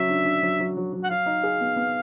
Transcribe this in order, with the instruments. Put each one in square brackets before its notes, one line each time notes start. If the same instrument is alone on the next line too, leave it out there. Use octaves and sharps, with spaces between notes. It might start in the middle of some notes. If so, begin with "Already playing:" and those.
Already playing: [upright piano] C#3 F#3 [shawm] E5
[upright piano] D4
D4
F#3
F#3
F#3
F#3
[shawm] F#5
[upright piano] F#3 [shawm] F5
[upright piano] D#4
G#4
B3
B3